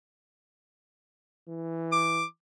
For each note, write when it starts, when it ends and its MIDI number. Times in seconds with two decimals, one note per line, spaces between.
1.48 2.23 52
1.92 2.24 86